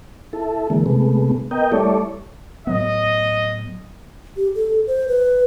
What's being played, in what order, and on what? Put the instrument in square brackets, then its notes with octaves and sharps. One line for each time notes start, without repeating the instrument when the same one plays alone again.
[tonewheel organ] E4 A4
D3 E3 G#3 A#3
C3 G#3 A3 B3
B3 A#4 D#5 G5
G3 A3 E4 A4 C#5 D5
[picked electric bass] A2 F#3 B3 [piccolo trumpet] D#5
[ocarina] G4
A4
C5
B4